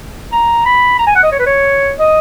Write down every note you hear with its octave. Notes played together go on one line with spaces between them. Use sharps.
A#5
B5
A#5
G#5
F#5
D#5
C#5
B4
C#5
D#5